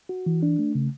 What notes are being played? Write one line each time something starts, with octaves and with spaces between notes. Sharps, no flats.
F#4
E3
D4
A3
C#3